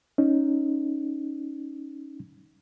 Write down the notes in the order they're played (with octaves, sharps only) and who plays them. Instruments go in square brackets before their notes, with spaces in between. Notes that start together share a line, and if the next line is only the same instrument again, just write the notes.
[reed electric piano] C#4 D#4